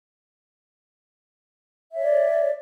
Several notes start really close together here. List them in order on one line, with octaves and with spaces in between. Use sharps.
E5 C#5 D5